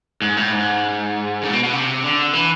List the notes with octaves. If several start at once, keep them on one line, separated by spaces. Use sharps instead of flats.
G#2
A2
G#2
A2
B2
B2
C3
D3
E3